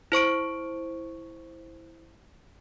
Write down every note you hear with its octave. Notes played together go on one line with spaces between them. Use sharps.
E4 C5 C#6 D7